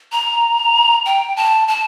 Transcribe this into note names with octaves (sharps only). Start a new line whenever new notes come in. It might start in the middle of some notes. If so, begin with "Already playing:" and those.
A#5
G5
A5
A5